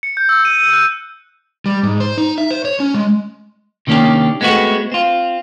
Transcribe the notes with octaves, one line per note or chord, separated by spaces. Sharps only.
C#7
G6
E6
D#7
D#7
F#6
G3
G#2
C5
D#4
E5
C5
C#5
C#4
G#3
C3 D#3 A#3 C#4 D4 G4
G#3 A3 B3 C4 F#4
C4 F4